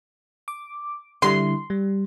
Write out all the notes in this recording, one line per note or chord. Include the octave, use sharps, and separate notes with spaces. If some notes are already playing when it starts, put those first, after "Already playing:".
D6
D3 G3 E4 C6
G3